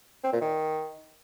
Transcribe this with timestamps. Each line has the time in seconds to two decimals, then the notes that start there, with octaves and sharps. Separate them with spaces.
0.24 C4
0.33 A#2
0.41 D#3